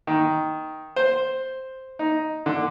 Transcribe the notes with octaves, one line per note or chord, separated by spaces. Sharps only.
D#3
C5
D#4
D3